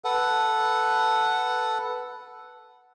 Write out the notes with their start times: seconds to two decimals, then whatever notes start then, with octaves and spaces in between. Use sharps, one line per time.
0.04 A4 B4 F#5